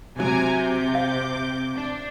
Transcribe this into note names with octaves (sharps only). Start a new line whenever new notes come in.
C3 F#3 G#5 A#5 D6
D6 G6
F5
D4